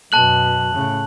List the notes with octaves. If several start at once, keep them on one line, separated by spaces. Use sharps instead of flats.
F#2 B2 A5 F#6 F#7
A2 C#3